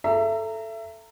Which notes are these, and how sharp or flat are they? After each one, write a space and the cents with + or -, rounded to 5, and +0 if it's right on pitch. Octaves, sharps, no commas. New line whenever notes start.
A4 +0 E5 +25 A#5 -20